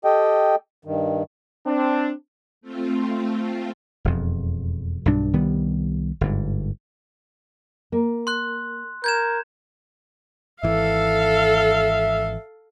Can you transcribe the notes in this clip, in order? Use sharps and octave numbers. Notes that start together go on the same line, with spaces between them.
G4 A4 D#5 G5
G2 D#3
C4 D4
A3 C4 F4
E1 F2
B1 G2 D4
C2 D#3 G3 B3
G1 G#2
A#3
C6 F#6
A#4 G6 G#6 E7
G#1 E3 A4 E5 F5